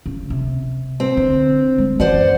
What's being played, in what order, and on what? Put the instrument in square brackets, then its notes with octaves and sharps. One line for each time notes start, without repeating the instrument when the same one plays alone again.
[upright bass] C#3
C3
[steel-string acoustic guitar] C4
[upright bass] D3
G#3
[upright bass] F#2 E3 [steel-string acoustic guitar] C5 D5 F#5